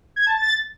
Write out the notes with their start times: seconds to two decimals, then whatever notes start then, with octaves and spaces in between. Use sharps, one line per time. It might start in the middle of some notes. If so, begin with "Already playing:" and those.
0.16 G#6
0.27 A5
0.37 A6